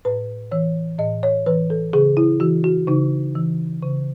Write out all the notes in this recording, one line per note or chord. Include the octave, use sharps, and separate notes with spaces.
A2 B4
E3 C#5
A2 D#5
C#5
E3 B4
A4
C#3 G#4
E4
E3 F#4
F#4
C#3 D#4
E3
C#3